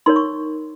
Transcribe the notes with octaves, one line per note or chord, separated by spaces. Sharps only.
D#4 A#4 C#5 C6
C#6